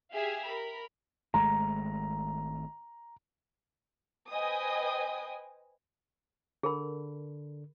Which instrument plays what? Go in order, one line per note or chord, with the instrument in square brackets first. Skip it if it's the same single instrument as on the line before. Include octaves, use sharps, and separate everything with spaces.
[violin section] G4 G#4 E5 F5 G#5
A#4 B5
[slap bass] G#1 G#3 A3 [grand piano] A#5
[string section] B4 C5 D#5 G5 G#5 D#6
[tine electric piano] D3 [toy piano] G#4 A#4 B5